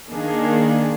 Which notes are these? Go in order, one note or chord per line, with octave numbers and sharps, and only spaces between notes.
D#3 A#3 D4 G#4